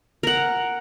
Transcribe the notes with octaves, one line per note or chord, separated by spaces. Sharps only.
A#4 F#5